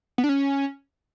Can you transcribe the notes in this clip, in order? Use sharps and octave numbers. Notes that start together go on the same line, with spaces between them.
B3
D4
C#4